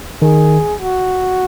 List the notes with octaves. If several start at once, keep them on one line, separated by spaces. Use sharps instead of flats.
D#3 G#4
F#4